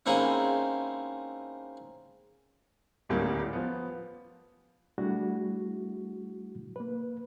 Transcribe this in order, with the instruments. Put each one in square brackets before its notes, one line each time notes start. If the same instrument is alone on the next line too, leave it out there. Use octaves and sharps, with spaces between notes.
[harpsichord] G#3 A#3 C4 C#4 D#4 E4
[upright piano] D#1 D2 A2 G3 A#3 C#4
F3 B3
[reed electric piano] G3 A3 D4 E4 F#4 G#4
A#3 B4